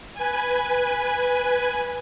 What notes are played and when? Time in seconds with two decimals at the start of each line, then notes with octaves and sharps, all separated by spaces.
0.14 B4 G#5